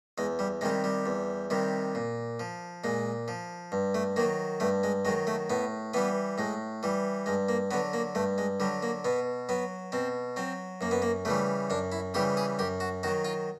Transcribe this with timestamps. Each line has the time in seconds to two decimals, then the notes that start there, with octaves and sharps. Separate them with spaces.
0.18 E2 G#3
0.39 G3
0.61 C3 D#3 G3 G#3
0.84 G3
1.06 E2
1.50 C3 D#3 G3
1.95 A#2
2.40 F3
2.84 A#2 G#3
3.28 F3
3.72 G2
3.95 A3
4.16 D#3 F#3 A#3
4.60 G2 A3
4.84 G#3
5.05 D#3 F#3 G#3
5.27 A3
5.50 A2 B3
5.94 E3 G3 B3
6.38 A2 G#3
6.83 E3 G3
7.26 G2 G#3
7.49 A#3
7.71 D3 F#3 B3
7.93 A#3
8.15 G2 A3
8.38 G#3
8.60 D3 F#3 G3
8.83 A#3
9.05 B2 B3
9.49 F#3 B3
9.92 B2 C4
10.36 F#3 C4
10.81 F#2 A#3
10.91 B3
11.02 A#3
11.25 C#3 E3 G3 A3
11.70 F#2 D4
11.92 E4
12.14 C#3 E3 G3 G4
12.37 G#4
12.59 F#2 G4
12.80 F#4
13.03 D#3 F#3 F#4
13.25 F4